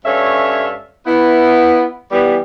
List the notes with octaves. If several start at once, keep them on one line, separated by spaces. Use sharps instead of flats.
G2 C#4 A4 C#5 E5 F5
B3 E4
E3 G3 B3